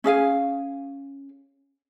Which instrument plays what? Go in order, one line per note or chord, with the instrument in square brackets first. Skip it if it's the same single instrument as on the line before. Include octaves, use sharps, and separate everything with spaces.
[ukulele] C#4 G#4 F5 G#5